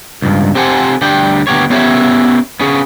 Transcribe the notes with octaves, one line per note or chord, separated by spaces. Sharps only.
C#2 G2
C4 G4 A4 C5 F#5 G#5
D2 G3 D4 G5
D2 B3 G4 C#5
B3 C#4 E4 G4 C#5 E5
B3 C#4 G#4